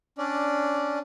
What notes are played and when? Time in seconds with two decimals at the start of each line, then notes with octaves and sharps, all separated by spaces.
0.18 C#4 D4 D5